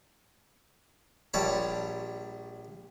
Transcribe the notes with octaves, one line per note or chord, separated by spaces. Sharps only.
A#1 G3 C#5 A5 B5